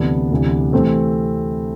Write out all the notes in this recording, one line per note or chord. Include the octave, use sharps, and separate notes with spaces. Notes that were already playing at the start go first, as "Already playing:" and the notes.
Already playing: D2 C3 E3 B3 D4
D2 C3 E3
C3 E3 A3 C4